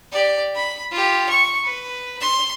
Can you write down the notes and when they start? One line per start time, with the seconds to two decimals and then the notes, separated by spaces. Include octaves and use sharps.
0.12 G4 D5
0.55 B5
0.92 F4 G4
1.29 C#6
1.63 B4
2.21 C6